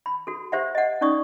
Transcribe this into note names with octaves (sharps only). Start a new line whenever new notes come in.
B5
F#4 A4
G4 C5 E5 F#5
D#5 F#5
C#4 D#4 D5 C#6 D#6